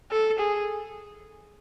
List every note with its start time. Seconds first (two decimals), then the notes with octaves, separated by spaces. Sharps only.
0.11 A4
0.39 G#4